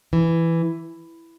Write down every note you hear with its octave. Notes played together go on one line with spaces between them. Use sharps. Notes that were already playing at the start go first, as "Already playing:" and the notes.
E3